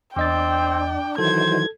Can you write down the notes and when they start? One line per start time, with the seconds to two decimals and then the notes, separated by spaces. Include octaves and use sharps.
0.16 E2 C4 D4 D#5 G5 A6
1.18 D#3 E3 F#3 A4 C5 G#6